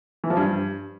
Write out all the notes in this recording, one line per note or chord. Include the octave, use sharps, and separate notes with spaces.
E3
F3
G2